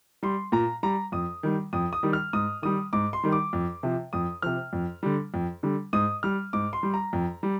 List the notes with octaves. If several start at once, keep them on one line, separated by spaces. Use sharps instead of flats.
G3 C6
A#2 A#5
G3 A#5
F2 D#6
D#3 G3
F2 D#6
D#6
D#3 G3
F6
G#2 D#6
D#3 G3 D#6
G#2 D6
C6
D#3 G3
D6
F2
C3 F3
F2 D#6
C3 F3 F6
F2
D3 G3
F2
D3 G3
G#2 D#6
G3 F6
G#2 D6
C6
G3
A#5
F2
G3